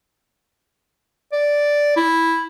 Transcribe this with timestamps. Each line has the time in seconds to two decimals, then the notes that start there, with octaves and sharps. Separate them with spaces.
1.33 D5
1.96 E4